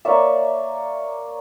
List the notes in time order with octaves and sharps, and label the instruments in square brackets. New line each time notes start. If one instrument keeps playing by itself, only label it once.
[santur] A#3 C#5 D5 [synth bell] E5